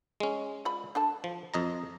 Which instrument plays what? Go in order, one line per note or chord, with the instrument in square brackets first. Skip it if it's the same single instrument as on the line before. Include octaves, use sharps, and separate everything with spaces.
[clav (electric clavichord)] G#3 C#4
[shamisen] F4 D5 B5
D4 A4 A5
[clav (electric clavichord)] F3
F2 D#5 A#5